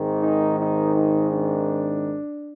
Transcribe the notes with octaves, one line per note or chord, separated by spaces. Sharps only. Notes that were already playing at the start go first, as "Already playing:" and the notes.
Already playing: G#1 G#2 D#3
D#4
D#4
D#4
D4